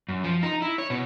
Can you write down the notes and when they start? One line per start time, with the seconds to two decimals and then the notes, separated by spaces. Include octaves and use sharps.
0.09 F#2
0.24 F3
0.43 D#4
0.62 E4
0.78 C#5
0.90 B2